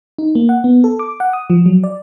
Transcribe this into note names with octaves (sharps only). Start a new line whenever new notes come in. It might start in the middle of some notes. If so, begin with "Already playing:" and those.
D#4
A#3
F#5
B3
A4
D6
F#5
D#6
F3
F#3
D5